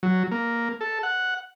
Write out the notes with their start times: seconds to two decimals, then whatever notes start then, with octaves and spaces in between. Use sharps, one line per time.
0.03 F#3
0.31 A#3
0.81 A4
1.03 F#5